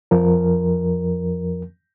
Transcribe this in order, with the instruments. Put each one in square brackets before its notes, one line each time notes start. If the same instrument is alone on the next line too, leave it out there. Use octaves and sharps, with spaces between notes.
[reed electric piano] F2 F3 A#4